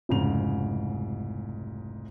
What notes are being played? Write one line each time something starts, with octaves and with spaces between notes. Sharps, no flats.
F1 C2 G#2 C#3 F7